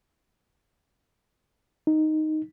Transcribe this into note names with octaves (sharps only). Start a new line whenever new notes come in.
D#4